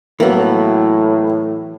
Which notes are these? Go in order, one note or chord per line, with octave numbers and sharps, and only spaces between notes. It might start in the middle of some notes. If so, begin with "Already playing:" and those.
A2 E3 F#3 A#3 B3